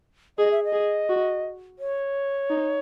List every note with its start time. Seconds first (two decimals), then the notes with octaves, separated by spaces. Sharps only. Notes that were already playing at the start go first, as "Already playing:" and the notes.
0.38 G#4 D#5
0.51 E5
0.64 D#5
0.73 G#4
1.09 F#4
1.79 C#5
2.50 D#4